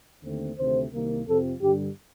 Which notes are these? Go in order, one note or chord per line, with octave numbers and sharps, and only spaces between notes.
D#2 D3 A3 C4
D2 C3 D#3 A3 C4 C5
C2 C3 D#3 A#3
F2 C3 F3 C4 A4
G2 D3 G3 G4